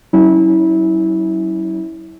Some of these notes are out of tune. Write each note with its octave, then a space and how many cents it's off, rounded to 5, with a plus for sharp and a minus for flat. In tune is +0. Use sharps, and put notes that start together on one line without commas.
F#3 +30 C#4 +0 E4 -25